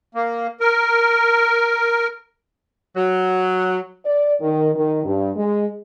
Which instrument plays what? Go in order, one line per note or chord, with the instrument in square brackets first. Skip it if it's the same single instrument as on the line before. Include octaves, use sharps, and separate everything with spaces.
[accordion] A#3
A#4
[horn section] F#3
[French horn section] D5
D#3
D#3
G2
G#3